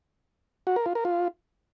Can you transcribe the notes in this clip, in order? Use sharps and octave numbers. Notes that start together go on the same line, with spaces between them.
F#4
A#4
F4
A#4
F4